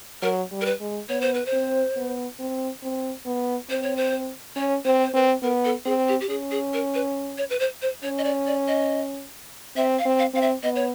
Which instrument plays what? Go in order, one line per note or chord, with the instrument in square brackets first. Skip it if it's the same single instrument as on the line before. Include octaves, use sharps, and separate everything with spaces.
[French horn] F#3 [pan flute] A#4
[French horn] G3
[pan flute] A#4
B4
[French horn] G#3
[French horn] B3 [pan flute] C#5
[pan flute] C5
B4
C5
[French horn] C4
B3
C4
C4
B3
[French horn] C4 [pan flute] C5
[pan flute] C#5
C5
[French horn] C#4 [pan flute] C#5
[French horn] C4 [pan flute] C5
[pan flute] C5
[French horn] C4 [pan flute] B4
[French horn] B3 [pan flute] A#4
[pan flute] A4
[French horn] C4 [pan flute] G#4
[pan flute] G4
G4
[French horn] C#4 [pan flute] G#4
[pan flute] G#4
A#4
B4
C#5
B4
C5
C5
[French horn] C#4 [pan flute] C#5
[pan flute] D#5
D5
D5
D#5
[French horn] C4 [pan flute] E5
[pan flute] F5
[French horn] C4
[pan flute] F5
[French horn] C4 [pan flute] F5
[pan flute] E5
[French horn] B3 [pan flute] D#5
[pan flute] C#5